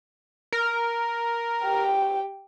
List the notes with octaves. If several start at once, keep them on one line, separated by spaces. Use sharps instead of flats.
A#4
G4 G5